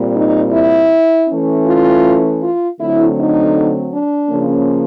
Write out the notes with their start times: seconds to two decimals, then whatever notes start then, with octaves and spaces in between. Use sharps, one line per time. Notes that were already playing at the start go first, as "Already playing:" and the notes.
Already playing: A#2 G3 C4
0.15 D#4
0.53 E4
1.28 E3 A3 C#4
1.66 F4
2.41 F4
2.79 D3 F#3 A3 C4 E4
3.17 D#4
3.93 D4
4.30 C#3 F3 A#3 C#4